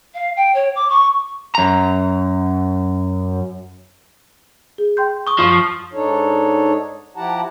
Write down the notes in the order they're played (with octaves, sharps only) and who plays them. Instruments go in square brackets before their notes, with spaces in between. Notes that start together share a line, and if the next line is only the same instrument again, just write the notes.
[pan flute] F5
G5
C#5
D6
C#6
[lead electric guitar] F#2 A#5
[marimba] G#4
G5 C6 G6
[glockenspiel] C#6 D#6
[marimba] F#2 [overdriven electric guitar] F3
[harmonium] G#2 D4 D#4 A4 C#5
F3 E4 G4 F#5 A5 A#5